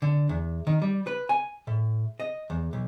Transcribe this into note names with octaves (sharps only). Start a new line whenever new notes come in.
D3
E2
D#3
G3
B4
G#5
A2
D#5
E2
B1